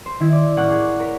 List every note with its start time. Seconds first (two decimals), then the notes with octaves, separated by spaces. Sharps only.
0.06 C5
0.20 D#3 E4 B6
0.32 D5
0.56 A1 A#3 F#5 C#6 D6 F#6
0.70 G#4
0.99 A#4 C#5 B6